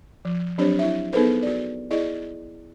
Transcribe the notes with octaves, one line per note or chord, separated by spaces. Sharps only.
F3
F#3 C4 D4 G4 C5 C#5
E4 E5
B3 D#4 G#4 A4 B4 C5
F#4 D5
E4 G#4 D5 D#5